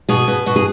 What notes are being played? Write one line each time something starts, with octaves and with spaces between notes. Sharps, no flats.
B2 G#4
B2
B2 F#4
G#4